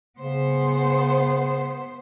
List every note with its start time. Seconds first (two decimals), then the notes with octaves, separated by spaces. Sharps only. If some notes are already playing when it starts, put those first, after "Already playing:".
0.19 C#3 B3 C5